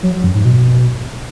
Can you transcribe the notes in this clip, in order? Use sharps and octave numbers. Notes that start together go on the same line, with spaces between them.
F#3
F#3
F#2
G#2
B2